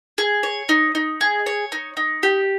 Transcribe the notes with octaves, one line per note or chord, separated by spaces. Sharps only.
G#4
C#5
D#4
D#4
G#4
C#5
D#4
D#4
G4